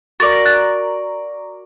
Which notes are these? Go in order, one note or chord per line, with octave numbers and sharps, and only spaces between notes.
F#4 A#4 D5 A6
A#6
F#6 A6